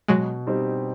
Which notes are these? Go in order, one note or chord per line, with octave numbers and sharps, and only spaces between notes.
B2 F#3 G#3
G3 C4 D#4 G4